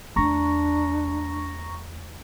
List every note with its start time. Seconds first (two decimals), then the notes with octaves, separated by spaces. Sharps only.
0.16 E2 A3 D4 A#5 C#6 A#6